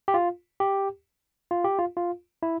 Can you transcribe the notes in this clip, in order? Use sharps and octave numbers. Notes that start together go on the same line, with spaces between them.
G4
F4
G4
F4
G4
F4
F4
E4